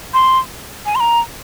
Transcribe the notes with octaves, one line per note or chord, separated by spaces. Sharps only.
C6
G#5
C6
A#5